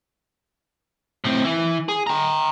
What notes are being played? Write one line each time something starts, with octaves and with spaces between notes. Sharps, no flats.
A2 C4
E3
G#4
G5 A#5